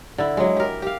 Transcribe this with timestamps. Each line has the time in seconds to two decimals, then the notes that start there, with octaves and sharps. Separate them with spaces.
0.18 D3 E4
0.37 F#3 G#3
0.57 G4 A#4
0.82 G4 F5